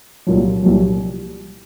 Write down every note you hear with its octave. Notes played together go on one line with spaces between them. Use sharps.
C2 A#2 F#3
C2 A#2 F#3